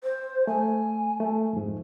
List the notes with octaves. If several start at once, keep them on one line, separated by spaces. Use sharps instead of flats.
C5
A3 G#5
A3
F2 G#2